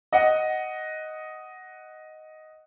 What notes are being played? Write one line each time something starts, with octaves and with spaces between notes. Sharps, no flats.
D#5 F#5